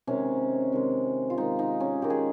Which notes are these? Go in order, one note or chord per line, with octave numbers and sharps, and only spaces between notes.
C3 D#3 G#3 C#4
C3 D#3 G#3
F4
D#3 G#3 D#4
D#4
C#4
D#3 G#3 G4
G#4